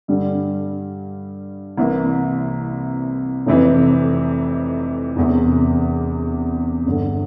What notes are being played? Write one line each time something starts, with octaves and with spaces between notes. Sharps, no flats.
G2 D3 G3
C2 C3 E3 A#3
F1 F2 C3 E3
E1 E2 C3
G1 G2 D3